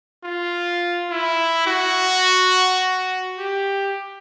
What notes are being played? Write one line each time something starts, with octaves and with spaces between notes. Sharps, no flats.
F4
E4
F#4
G4